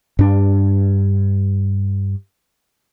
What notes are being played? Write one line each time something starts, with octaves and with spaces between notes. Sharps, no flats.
G2 D4